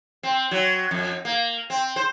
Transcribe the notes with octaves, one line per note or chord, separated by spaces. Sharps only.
C4
F#3
F2
A#3
C4
C5